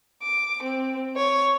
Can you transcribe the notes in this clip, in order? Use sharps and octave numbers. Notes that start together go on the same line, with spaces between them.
D6
C4
C#5